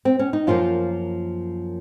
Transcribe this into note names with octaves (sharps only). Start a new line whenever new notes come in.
C4
C#4
D#4
F#2 F3 A#3 F4